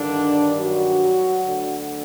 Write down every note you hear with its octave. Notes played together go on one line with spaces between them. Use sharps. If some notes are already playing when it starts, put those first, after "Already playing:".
Already playing: G2 D3 D#3 D4
F#3 F#4
D2 D3